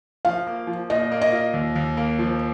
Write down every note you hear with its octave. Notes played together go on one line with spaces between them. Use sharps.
F3 F5
A#3
F3
A#2 D#5
A#3
D#5
F4
D#2
D#2
A#3
F3